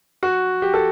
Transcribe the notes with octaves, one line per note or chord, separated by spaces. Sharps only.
F#4
G4
A4